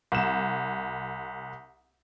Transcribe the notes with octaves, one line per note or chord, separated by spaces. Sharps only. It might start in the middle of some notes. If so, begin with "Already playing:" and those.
C2 E7